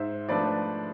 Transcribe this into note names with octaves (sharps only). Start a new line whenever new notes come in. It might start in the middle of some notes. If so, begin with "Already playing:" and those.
Already playing: G#2 C5 E5
F3 A3 D4 B4 D5